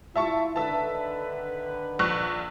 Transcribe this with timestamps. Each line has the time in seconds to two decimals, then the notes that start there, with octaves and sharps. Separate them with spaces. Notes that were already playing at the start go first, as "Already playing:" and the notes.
0.16 E4 F4 E5 A5 C#6
0.56 D3 D#3 B4 E5 A5
1.99 A#1 C#6 F#6